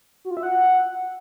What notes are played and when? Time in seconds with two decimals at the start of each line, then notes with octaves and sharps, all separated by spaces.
0.25 F#4
0.31 F4
0.37 E5
0.43 F#5